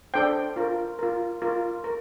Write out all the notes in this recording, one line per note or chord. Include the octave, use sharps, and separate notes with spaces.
D4 A4 C5 G5
F4 A#4
F4 A#4
F4 A#4
A#4